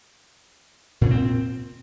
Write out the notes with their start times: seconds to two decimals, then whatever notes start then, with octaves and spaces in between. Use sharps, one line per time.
1.01 A#2
1.06 C#4
1.11 C4